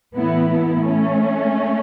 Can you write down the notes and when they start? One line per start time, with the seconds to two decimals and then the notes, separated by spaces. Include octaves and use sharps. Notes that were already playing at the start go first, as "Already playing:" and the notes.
0.14 A2 E3 B3 E4
0.50 B3 E4
0.85 A3 C#4